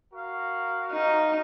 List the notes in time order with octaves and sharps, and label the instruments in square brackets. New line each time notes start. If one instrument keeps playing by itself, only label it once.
[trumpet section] F#4 A#4 F5
[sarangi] D#4